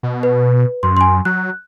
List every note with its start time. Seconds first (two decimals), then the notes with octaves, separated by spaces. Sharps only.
0.03 B2
0.23 B4
0.83 F#2 C6
0.97 F#2 G#5 C6
1.25 F#3 F#6